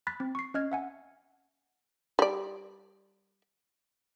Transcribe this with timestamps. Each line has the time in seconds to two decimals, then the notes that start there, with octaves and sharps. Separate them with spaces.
0.07 B5 F#6 A6 B6
0.20 C4
0.35 C#6 C7
0.54 C#4 D#5 F6 G#6
0.72 E5 F#5 G#5
2.19 G3 D5